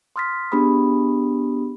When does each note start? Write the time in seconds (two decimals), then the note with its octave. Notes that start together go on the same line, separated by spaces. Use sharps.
0.16 C6 D#6 F6 A6 B6
0.52 B3 D4 G4 G#4 B5 D#6